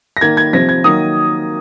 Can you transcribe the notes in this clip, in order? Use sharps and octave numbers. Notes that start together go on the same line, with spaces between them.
A#6
D#3 A#3 G#6
G#6
C3 F3 C4 A#6
G#6
D#3 F#3 A#3 D#6